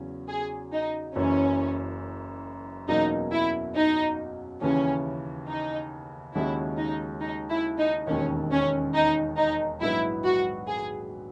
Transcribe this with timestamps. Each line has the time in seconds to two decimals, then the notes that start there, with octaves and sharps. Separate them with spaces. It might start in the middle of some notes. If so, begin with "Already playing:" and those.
Already playing: E2 C#3 F#3 C#4
0.29 G#4
0.72 D#4
1.16 F#1 F#2 E3 C#4
2.88 E2 B2 F#3 A#3 C#4 D#4
3.32 E4
3.75 D#4
4.61 D#2 C#3 E3 C#4
5.48 D#4
6.35 D#2 C#3 G#3 C#4 E4 F#4
6.78 D#4
7.21 D#4
7.50 E4
7.79 D#4
8.07 E1 D#2 D#3 C#4
8.51 C#4
8.94 D#4
9.37 D#4
9.81 A#1 G#2 F#3 B3 E4
10.24 F#4
10.67 G#4